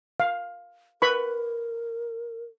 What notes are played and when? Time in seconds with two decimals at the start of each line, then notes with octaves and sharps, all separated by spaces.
0.20 F5
1.02 A#4 B4 B5 C#6